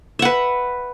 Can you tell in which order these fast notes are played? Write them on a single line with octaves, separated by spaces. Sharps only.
E5 F#5 B4